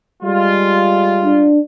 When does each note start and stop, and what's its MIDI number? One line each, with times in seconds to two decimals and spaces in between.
0.23 1.53 55
0.23 1.53 56
0.23 1.53 65
1.25 1.59 62